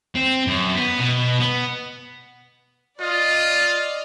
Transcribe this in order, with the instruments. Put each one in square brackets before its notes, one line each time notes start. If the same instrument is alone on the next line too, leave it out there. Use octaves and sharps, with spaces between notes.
[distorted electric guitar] C4
F#2
B3
B2
B3
[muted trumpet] F4 [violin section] D5 D#5 F6